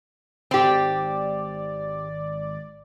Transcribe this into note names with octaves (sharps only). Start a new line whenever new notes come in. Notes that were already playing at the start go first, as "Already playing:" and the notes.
G#1 C4 G4 D5